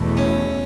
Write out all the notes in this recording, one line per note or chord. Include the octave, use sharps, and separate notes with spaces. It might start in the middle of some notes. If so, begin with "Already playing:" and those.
Already playing: E2 B2 A3
C#4